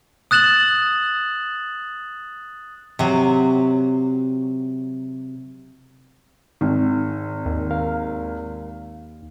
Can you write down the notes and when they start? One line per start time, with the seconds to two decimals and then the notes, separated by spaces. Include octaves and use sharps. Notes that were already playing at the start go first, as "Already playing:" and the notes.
0.31 D#6 F#6 A6 E7 F#7
2.99 C3 F#3
6.61 G#1 D#3
7.46 D#2
7.71 A#4 F5